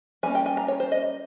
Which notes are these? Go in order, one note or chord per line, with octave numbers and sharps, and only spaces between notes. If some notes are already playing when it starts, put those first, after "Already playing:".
G3 A#3 C#4 G#5
G5
G#5
A#5
C#5
C5
D#5